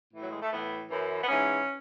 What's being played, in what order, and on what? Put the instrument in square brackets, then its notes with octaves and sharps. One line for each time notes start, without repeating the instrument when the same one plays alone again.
[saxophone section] A2 E3
F#3
G#3
A3
A2 E3 B3
F#2 E3
B3
G#2 E3 C#4